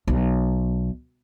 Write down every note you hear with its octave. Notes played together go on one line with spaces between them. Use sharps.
B1